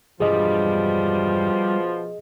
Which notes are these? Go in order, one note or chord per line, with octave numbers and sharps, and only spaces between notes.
E1 G2 B2 F3 G3 D4 G#4 D#5